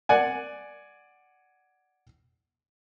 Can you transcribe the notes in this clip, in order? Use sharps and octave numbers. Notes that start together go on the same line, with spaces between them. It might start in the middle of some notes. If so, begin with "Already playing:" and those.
D5 F#5 G#5